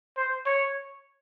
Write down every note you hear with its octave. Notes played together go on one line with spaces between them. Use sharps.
C5
C#5